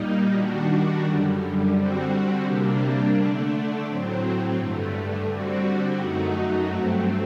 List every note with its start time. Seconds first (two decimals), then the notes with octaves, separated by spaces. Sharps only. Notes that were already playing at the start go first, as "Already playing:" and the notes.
Already playing: A#2 G3 A#3 D#4
0.32 D#3 G3 D4 F#4
1.03 F#2 D3 G3
1.73 D3 G3 C4 F#4
2.44 C3 G3 A#3 D4
3.14 D3 A3 D4
3.84 A2 F#3 C4
4.55 G2 D3 A3
5.25 D3 G3 C4 F#4
5.96 F#2 F#3 A3 D#4 F#4
6.66 G2 F#3 A3 C4